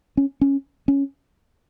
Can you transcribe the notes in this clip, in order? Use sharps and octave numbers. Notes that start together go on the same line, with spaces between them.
C#4
C#4
C#4